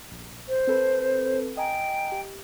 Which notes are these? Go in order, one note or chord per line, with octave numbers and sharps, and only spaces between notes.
A#1
C5
C4 A4 B4
D#5 G5 G#5 A#5
G4